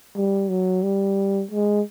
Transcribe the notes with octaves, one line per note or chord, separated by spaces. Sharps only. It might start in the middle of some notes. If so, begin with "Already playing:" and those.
G3
F#3
G3
G#3